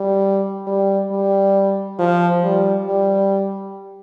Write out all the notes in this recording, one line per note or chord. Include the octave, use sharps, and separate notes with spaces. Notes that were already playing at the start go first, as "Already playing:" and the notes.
Already playing: G3
G3
G3
F3
G3
G3